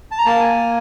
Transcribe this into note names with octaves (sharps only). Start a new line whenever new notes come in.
A5
A#5
A#3 A5
G#5